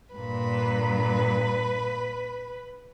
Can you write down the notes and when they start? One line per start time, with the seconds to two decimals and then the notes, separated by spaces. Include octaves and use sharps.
0.15 G2 A#2 B4